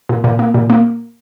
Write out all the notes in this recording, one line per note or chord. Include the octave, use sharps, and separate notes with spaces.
A#2
A#2
A#3
A#2
A#3